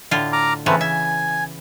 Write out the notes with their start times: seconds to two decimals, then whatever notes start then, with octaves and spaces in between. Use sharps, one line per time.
0.11 A2 D3 F4
0.33 A#5 D6 F6
0.66 C#3 E3 A3 B3 C4 B4
0.81 E5 G#5